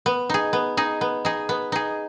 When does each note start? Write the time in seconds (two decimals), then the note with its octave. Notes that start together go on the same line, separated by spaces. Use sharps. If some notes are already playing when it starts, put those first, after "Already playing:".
0.06 B3
0.30 D#4 G#4
0.53 B3
0.77 D#4 G#4
1.01 B3
1.25 D#4 G#4
1.49 B3
1.72 D#4 G#4